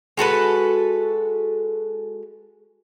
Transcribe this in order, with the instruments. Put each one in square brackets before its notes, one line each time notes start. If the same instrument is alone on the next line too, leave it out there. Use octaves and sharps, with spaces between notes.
[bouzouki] G#3 F#4 A4 B4